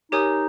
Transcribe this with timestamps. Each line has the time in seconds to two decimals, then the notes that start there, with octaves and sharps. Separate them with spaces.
0.12 D#4 G4 A#4 C#5 G#5 D#6